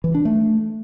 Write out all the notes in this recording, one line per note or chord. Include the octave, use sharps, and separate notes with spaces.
E3
D4
A3